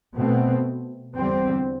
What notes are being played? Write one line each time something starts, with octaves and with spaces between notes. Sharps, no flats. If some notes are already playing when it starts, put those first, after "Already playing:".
B2 A3 C4
E2 D3 G3 C4